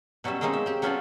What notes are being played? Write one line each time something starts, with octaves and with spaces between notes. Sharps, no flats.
B2 F#3 G3 C#4 E5
G#3 A#3 C4 C#4 D#4
E5
C4 G4
F#3 B3 C#4 F4 A4 D5